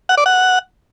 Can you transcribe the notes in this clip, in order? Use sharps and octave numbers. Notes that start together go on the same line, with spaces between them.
F#5
D5
F#5